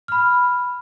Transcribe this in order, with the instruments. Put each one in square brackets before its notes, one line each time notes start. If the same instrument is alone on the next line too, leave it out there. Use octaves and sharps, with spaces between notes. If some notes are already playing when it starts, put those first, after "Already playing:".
[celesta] B5 F6